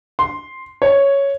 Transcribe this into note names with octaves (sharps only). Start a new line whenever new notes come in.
C6
C#5